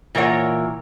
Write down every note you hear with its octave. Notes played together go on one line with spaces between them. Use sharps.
A#2 E3 A#4 C#5 F#5